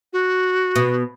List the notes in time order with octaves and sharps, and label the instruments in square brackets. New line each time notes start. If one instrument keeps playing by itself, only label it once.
[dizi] F#4
[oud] B2